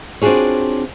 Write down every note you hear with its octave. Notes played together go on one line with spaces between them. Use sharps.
C4 D4 F4 F#4 G#4 C#5